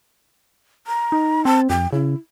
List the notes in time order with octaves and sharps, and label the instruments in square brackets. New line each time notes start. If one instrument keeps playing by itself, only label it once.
[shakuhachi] A#5
[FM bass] D#4
[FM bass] C4 [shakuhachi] A5
[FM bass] F2 [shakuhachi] G5
[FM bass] C#3 [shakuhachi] E4